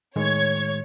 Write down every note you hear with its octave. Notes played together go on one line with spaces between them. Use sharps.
A2 D#3 G#3 C#5 G#6